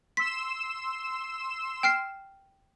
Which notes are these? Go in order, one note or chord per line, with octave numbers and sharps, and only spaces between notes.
C6 E6 B6 E7
G5 F6 C7